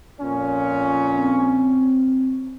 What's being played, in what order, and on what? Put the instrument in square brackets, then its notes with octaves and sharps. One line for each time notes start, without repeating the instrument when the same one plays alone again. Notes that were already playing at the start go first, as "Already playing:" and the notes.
[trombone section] F2 A#2 C#4
[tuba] C4